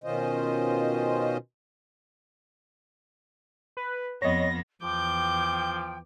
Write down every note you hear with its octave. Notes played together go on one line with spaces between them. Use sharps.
B2 D#3 C#4 F4 C5 D#5
B4
F2 B3 C#5 D#5 A#6
E2 F3 G5 D6 G6